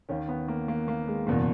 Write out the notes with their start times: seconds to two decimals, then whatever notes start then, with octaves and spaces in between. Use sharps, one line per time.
0.09 D#2 D#3 C#4
0.28 B3
0.48 A#3
0.68 A#3
0.88 A#3
1.08 G#3
1.27 F#1 E2 B2 A#3